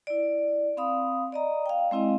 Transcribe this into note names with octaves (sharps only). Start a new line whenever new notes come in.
E4 D5
C4 F5 B5 D#6
D5 D#5 A#5
F5 G5
G#3 C4 E4 D#5 F5